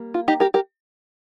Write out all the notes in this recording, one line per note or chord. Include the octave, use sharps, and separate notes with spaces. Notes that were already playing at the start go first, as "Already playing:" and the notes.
Already playing: G3 A#3
F4
D#4 G4
G4 A#4
G4 A#4